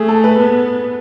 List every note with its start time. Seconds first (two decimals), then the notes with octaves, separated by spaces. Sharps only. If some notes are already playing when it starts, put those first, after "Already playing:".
Already playing: A3 G#4
0.08 A4
0.24 B4
0.39 B3